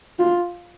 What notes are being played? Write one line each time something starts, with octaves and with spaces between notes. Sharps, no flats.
F4